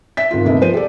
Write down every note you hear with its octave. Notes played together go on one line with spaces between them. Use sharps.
E5 B6
G#1 F4
G1 D#2 C3 A3 B4 D#5
F3 C5 D#7
G4 A4 D5